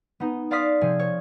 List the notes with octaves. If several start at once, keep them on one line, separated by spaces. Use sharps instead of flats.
B3 D#4
D5 F5 C6 D#6 F6 B6
C3 F3 G#4
C#5